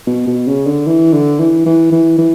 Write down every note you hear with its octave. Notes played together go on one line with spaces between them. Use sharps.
B2
B2
C#3
D3
E3
D3
E3
E3
E3
E3